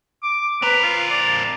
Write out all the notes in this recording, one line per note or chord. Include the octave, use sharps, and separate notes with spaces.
D6
C4 A#4 B4
F4
D5